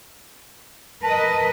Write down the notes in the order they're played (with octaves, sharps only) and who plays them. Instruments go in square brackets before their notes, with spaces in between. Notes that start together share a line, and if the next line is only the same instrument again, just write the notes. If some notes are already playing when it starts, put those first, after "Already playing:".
[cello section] A#4 B4 D#5 [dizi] A5